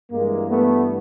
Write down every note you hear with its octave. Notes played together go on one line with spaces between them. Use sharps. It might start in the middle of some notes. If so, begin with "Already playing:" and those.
G2 E3 G#3 A#3
A3 B3